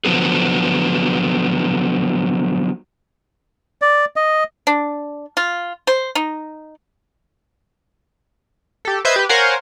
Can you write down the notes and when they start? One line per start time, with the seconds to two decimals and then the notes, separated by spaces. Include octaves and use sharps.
0.05 D3 F3 F#3 B3 G#4
3.82 D5
4.16 D#5
4.67 D4
5.37 F4
5.87 C5
6.15 D#4
8.85 G4 A4
9.05 B4 C5 D#5 E5 G6 G#6
9.16 G4 B4
9.29 A#4 C5 C#5 F5 F#5 G#5